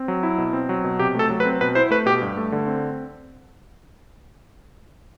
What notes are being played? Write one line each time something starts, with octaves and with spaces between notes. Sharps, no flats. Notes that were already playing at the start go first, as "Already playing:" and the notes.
Already playing: C4
F#3
E4
B2
C4
F#3
B2
C3 G4
A3 A4
F#3
B4
C4
B2 B4
E4 C5
A3 B4
B2 G4
G2
A3
D3
C4